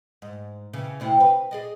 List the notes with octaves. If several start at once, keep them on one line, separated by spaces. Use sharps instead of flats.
G#2
C#3 E3
D2 C3 E4
B4
G#4 D5 D#5